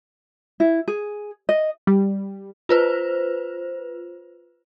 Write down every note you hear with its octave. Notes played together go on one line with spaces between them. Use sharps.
E4
G#4
D#5
G3
F4 B4 C5